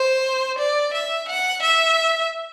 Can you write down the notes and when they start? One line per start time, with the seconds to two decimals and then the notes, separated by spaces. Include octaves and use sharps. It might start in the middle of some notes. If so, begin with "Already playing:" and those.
Already playing: C5
0.59 D5
0.94 E5
1.29 F#5
1.63 E5